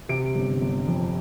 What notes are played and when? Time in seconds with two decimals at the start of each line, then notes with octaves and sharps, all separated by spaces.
0.09 C3 D7
0.35 G1
0.61 G1
0.87 F2